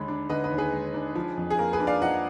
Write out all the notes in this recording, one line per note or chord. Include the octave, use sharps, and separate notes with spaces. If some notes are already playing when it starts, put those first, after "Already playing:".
Already playing: D#2 D3 G#3 B5
D4
D3 B4 D#5
B4 D#5
D#2
G#4 B4
G#3
D4
F3
F2
G#4
A#3 A#4
G#4 B4
D4
D5 F5
F3 D#5 F#5